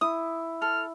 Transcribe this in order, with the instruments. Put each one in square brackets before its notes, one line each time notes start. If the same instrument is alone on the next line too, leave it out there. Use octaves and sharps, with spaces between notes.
[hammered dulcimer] E4 [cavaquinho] D#6
[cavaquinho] A4 [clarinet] F6